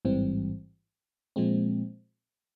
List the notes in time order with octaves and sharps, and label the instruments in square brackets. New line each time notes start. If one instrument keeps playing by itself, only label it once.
[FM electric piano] A1 G#2 E3 G3 C4
A#2 F3 G#3 C4